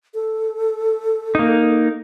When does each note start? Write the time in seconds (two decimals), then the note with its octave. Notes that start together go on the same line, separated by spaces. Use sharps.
0.14 A4
1.35 A#3 D#4